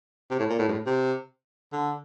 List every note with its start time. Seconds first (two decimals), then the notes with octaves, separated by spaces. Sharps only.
0.30 C3
0.39 A2
0.50 A#2
0.59 A2
0.68 G2
0.72 A2
0.86 C3
1.73 D3